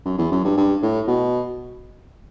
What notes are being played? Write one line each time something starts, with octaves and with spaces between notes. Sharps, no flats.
F#2
E2
F#2
G2
G2
A2
B2